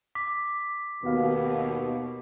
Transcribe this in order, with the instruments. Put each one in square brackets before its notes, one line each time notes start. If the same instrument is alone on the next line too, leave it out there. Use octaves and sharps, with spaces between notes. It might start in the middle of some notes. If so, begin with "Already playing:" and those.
[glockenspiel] D6 B6
[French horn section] D#2 B2 [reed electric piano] B3 F#4 F5